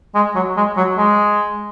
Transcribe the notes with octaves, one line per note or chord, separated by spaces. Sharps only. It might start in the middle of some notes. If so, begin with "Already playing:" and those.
G#3
F#3
G#3
F#3
G#3